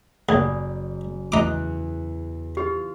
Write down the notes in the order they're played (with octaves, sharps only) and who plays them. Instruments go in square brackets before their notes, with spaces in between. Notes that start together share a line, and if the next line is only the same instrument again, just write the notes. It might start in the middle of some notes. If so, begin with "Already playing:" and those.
[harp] F#1 [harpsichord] D#2 [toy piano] D5 B5 D#6
[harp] E2 F#6 [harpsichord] D#4 D6
[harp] F4 [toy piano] G4